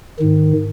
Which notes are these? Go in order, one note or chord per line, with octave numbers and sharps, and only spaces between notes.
G#2 D#3